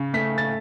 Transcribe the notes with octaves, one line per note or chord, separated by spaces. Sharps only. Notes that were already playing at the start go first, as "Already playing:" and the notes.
Already playing: C#3
A3 B6
A6